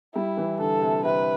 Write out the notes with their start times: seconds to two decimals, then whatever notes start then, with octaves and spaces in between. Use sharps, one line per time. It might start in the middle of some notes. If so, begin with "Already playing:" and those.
0.14 G3 E4
0.37 E3
0.59 D3 A4
0.82 C3
1.05 C3 B4